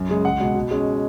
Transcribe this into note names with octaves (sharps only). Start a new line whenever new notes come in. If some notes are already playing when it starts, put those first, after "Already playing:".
Already playing: F#2
C#3 G#3
C#2 F#5
B2 G#3
B2
G#3 C#4